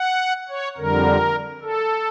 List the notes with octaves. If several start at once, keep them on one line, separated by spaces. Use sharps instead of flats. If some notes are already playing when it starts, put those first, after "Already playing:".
Already playing: F#5
C#5
F2 D3 G3 A#4
A4